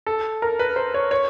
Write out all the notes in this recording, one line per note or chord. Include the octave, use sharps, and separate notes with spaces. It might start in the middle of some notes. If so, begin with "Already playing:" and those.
A4
A#4
B4
C5
C#5
C#5